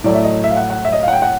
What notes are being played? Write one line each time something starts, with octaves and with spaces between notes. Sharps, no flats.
A2 F#3 A3 D5
E5
D#5
E5
F5
F#5
F#5
E5
D#5
F5
F#5
G5
F#5